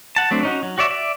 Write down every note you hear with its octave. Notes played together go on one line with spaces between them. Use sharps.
F#5 A5
F#3 A3 C4 D4
C#4 D#4 F#4
F#3
F#4 C#5 D5 E5
D5 E5